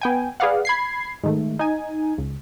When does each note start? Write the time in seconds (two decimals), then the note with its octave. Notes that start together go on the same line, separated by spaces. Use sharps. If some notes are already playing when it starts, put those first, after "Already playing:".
0.01 B3 G5 G#5
0.40 G#4 B4 D5 F5 F#5
0.65 B5 G#6 C7
1.24 G#2 D#3 A3
1.59 D#4 G#5
2.18 C#2